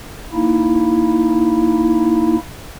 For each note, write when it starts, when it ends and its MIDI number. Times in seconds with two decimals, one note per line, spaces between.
0.34 2.37 58
0.34 2.37 63
0.34 2.37 64